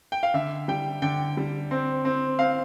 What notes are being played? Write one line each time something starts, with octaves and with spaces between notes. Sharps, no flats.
G5
F5
D3 E5
G3 G5
D3 G5
G3
C4
C4
C4 F5